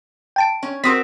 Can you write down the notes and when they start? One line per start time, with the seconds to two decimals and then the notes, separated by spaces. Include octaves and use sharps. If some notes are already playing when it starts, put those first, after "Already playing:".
0.36 G5 A5 D7
0.63 C#4
0.84 C4 F#4 A#4 C6 D#6 B6